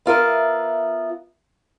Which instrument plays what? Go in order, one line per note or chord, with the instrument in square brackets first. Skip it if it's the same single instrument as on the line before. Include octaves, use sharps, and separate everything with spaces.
[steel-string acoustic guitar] B3 F4 A#4 E5